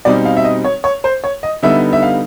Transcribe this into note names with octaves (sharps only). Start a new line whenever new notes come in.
B2 G3 C4 D#4 D5
F5
E5
D#5
C#5
C#5
C5
C#5
D#5
D3 G3 B3 D#4 E5
E5
F5